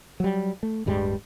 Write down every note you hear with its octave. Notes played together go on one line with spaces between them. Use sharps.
F#3 G3
A3
D1 G2 G3 G#3